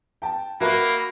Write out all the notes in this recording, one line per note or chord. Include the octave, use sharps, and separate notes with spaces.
G5 A5
A#3 F#4 A#4 E5 B5